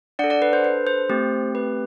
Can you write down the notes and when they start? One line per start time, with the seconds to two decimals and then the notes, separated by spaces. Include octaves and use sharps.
0.19 D4 D5 F#5
0.24 A4
0.30 D5 F#5
0.42 B4
0.53 C5
0.64 B4
0.87 C5
1.09 A3 C4 G4
1.55 B4